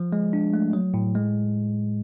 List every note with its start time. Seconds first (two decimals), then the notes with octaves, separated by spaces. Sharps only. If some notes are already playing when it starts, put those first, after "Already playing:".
Already playing: F3
0.13 G#3
0.33 D4
0.54 A3
0.73 F#3
0.94 A2
1.15 G#3